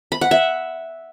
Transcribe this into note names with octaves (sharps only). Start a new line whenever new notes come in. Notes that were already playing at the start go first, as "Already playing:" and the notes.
B5
F#5
E5